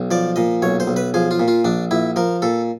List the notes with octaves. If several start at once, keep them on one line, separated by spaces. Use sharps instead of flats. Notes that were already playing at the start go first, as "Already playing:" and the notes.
Already playing: B1
F3 D5
A#2 D#5
B1 C#5
C5
B1
B4
F3 G#4
F4
A#2
F4
A#1 D4
A#1 E4
F3 A#4
A#2 A4